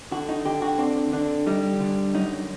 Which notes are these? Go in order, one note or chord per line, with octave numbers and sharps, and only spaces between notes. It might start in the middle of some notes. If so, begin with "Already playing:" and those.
D3 F#4
D#4
D3 G4
F#4
C4 D4
D3 D4
G3 D#4
D3
F#2 D#4